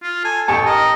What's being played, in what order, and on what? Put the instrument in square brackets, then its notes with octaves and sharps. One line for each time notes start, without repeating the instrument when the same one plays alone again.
[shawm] F4
[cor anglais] A4 [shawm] G#5
[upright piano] A1 G4 A5 [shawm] C#6
[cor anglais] A#4 [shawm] D#5